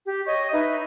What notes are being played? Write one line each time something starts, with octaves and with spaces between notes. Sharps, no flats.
G4
C#5 D#5 C#6
D#4 B4 E5